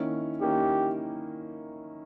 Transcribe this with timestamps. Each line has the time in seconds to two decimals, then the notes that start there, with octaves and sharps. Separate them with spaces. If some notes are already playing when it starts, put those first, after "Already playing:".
Already playing: D#3 A#3 C#4 E4
0.41 D#3 A#3 C#4 E4 G4